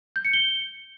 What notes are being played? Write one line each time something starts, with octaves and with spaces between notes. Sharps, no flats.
G6
C#7
G7